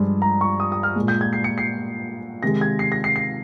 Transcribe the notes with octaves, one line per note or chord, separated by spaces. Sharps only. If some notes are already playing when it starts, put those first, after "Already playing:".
Already playing: G2 F3 G#3
A#5
C#6
D#6
D#6
F6
A#2 G#3
G6
G#6
C7
C#7
C7
C3 D#3 G#3 A#6
G#6
C7
A#6
C7
C7